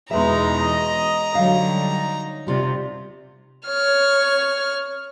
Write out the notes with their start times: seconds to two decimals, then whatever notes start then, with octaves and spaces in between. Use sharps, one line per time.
0.11 E2 B2 G#3 D#4 B4 E5 A#5
0.61 D#5
1.35 D3 F#3 G3 D#4 F5
2.47 C3 G3 F4 D5
3.67 C#5 F6